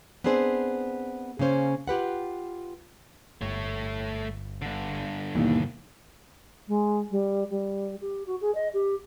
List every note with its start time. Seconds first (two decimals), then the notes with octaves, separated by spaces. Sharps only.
0.24 B3 C4 D4 G#4 C5
1.39 C#3 A#3 C#4 C5
1.88 F4 G4 B4 F#5
3.41 G1 A3 C#5
4.62 G2 D3
5.35 D#2 B2 E3
6.67 G#3
7.10 G3
7.50 G3
8.01 G4
8.26 F#4
8.41 G#4
8.54 D#5
8.73 G4